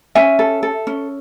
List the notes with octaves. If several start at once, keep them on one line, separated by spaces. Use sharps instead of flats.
C#4 E5 G#5
A4
A4
C#4